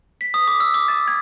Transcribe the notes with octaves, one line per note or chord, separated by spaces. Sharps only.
B6
D#6
D6
E6
D6
A6
G#6